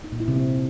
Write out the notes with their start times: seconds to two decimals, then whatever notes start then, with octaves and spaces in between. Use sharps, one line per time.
0.04 D#4
0.12 A#2
0.20 E4
0.28 C3
0.36 C4